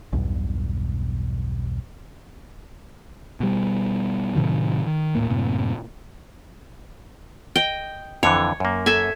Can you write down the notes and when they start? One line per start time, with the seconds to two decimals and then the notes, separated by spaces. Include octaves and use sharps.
0.13 B1 E2 G2 B2
3.40 B2 G3
4.35 A2 C3 D#3 F#3
4.86 D#3
5.15 D#1 A2 A#3
5.30 F#2 A2 C3 A#3
7.56 D#5 G5
8.23 F2 D3 E3 C#5
8.60 F#2 A#3
8.86 A4 E5 G#5